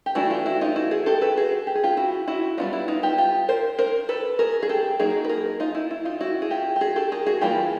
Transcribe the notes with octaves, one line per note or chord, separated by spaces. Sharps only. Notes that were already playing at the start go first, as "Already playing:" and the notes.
G4
E3 A3 D4 E4 F#4
F4 G4
E4 F#4
D#4 F4
E4 F#4
F#4 G#4
G4 A4
A4 B4
F#4 G#4
G4
G#4
F4 G4
E4 F#4
E4 F#4
G3 B3 D4 D#4 F4
E4
D#4 F4
F4 G4
F4 G4
A#4 C5
A#4 C5
A4 B4
G#4 A#4
G#4
G4 A4
F#3 A#3 D#4 G#4 A#4
B4
G#4 A#4
D#4 F4
E4
E4
D#4 F4
E4 F#4
G#4
F4 G4
G4
F#4 G#4
G4 A4
G#4 A#4
F#4 G#4
E3 G3 A#3 F4 G4